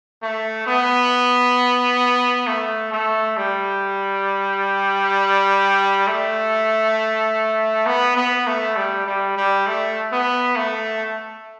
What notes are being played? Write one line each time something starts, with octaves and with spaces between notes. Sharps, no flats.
A3
B3
A3
A3
G3
A3
B3
B3
A3
G3
G3
G3
A3
B3
A3